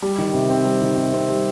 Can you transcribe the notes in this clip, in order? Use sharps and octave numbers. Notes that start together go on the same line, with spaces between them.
G3
D#3
C3
C4
G3
D#3
C3
C4
G3